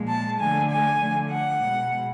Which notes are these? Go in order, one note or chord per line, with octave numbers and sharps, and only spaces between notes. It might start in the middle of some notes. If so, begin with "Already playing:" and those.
Already playing: A#2 F3 G#3
A5
D3 F3 A3 G#5
G#5
D3 F3 A3
F#5
B2 G#3